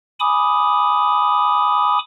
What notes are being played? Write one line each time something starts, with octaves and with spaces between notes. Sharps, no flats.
G#5 B5 D6 D#6